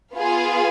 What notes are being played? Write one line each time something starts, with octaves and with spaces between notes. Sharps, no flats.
B3 F4 G#4 F5